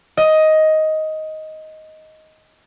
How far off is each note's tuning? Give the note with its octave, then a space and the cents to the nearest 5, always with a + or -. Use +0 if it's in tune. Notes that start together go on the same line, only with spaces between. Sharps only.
D#5 +10